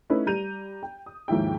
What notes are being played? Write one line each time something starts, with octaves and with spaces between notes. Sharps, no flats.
A3 C#4 D#4 E4 B4
G3 G4 A#5 G6 D#7 F7
G5
D#6
D#2 G#2 F3 E4 G5